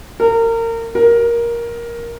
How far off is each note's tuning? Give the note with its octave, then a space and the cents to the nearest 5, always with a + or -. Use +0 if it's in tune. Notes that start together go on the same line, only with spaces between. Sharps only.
A#4 -30
A#4 +10